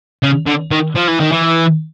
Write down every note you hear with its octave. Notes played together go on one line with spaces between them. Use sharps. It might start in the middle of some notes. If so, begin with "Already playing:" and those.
C#3
D3
D#3
F3
E3
D#3
E3